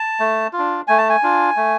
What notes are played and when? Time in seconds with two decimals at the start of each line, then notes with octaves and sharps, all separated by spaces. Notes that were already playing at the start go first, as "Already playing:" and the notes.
Already playing: A5
0.20 A3
0.53 F4
0.58 D4
0.88 A3 G#5
0.98 A5
1.09 G#5
1.23 D4 F4
1.56 A3